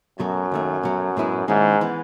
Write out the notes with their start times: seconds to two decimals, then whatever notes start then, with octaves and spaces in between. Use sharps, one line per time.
0.19 F#2 B2 F#3 A3
0.52 D#2 D#3 A3
0.83 B2 F#3 A3
1.17 A2 G#3 B3 E4 G#4
1.48 D#2 G#2 D#3 G#3 C#4 E4
1.81 E3 B3